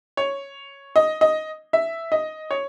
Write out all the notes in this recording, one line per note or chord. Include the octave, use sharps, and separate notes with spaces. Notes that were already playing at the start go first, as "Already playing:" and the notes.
C#5
D#5
D#5
E5
D#5
C#5